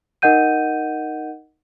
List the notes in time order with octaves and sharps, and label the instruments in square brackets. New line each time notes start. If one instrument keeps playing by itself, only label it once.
[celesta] D#4 A#4 D#5 F#5 G6 D#7